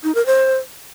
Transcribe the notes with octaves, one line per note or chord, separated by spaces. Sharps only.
D#4
A#4
C5